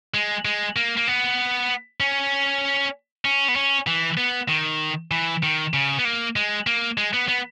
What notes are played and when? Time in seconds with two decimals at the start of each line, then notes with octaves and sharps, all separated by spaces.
0.14 G#3
0.45 G#3
0.76 A#3
0.97 A#3
1.07 B3
2.00 C#4
3.25 C#4
3.48 B3
3.56 C#4
3.87 E3
4.17 B3
4.49 D#3
5.11 E3
5.43 D#3
5.74 C#3
5.99 B3
6.05 A#3
6.36 G#3
6.67 A#3
6.98 G#3
7.14 B3
7.28 B3